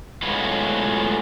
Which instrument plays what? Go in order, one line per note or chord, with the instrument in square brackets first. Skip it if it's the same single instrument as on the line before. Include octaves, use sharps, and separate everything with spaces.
[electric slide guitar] A2 F#3 G#3 B3 F4 B4